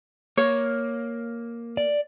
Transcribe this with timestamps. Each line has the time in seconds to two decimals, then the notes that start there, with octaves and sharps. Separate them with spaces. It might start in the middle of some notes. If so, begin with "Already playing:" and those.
0.37 A#3 C#5
1.77 D5